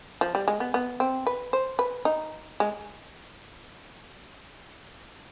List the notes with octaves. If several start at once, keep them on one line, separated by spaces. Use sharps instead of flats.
F3
G3
G#3
B3
B3
C4
B4
C5
B4
D#4
G#3